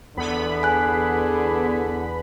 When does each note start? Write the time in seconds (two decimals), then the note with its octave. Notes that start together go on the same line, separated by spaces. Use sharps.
0.17 E2 D3 B3 B5
0.63 G#4 G#5 F#6